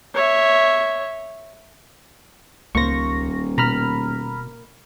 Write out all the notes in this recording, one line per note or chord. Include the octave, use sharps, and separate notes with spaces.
C#5 E5
D#1 C#2 A#3 C5 C#6 A#6
B2 A#5 B5 F6